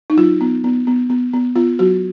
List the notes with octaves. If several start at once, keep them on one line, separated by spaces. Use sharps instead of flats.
D#4
F#3 F4
B3
B3
B3
B3
B3
B3 F4
F#3 F#4